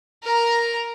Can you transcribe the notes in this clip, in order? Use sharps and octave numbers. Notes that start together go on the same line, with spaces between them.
A#4 A#5